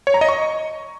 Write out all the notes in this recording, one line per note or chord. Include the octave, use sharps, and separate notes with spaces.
C#5
A#5
D#5
C#6